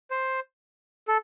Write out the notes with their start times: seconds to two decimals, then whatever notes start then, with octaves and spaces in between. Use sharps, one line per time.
0.11 C5
1.08 A4